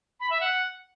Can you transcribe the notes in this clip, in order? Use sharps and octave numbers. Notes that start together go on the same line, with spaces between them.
B5
E5
F#5